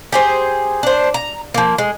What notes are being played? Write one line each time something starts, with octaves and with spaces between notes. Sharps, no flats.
G4 G#4 C5
D4 C5
A#5
F3 A#3
G#3